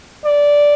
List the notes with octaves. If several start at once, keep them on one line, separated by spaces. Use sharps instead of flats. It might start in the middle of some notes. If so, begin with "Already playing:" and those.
D5